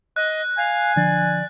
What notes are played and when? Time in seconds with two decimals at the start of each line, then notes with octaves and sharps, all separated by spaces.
0.16 D#5 F#6
0.58 F5 G#5
0.96 D3 F3 D4 D5